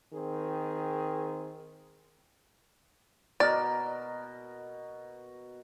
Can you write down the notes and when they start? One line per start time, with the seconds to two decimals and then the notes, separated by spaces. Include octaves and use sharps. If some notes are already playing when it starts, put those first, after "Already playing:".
0.13 D#3 C4 G#4
3.40 B2 A#4 D5